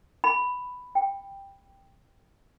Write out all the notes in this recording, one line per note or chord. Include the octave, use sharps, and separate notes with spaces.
B5
G5